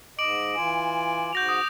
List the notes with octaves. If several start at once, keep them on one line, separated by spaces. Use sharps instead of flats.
G#2 D#5 D6 D7 F#7
E3 F4 G#5
G#2 F#4 G6 A#6 F7
D#6